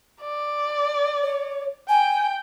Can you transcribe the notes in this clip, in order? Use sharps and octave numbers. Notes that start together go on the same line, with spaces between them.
D5
C#5
G5 G#5